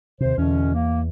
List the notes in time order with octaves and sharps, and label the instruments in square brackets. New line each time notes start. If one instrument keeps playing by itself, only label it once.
[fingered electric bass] D#2 C3 [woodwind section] C5
[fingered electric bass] E2 [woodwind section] B2 D3 C#4
[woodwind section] A#3